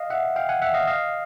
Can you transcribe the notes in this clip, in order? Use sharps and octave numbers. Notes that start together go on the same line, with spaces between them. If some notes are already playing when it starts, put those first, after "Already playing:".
Already playing: D#5 F5
E5 F#5
F5 G5
F#5 G#5
E5 F#5
D#5 F5
D#5 F5